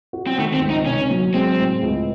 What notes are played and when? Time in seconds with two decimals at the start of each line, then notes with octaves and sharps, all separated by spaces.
0.13 F#4
0.27 C4
0.38 D#3 A3
0.54 C4
0.62 C#2
0.70 D#4
0.86 C3 C#4
1.11 F#3
1.34 G#3 C4
1.59 A2
1.83 C#2